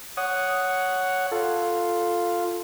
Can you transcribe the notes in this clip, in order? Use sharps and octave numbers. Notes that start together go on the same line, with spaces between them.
C#5 F#5 D#6
F4 A4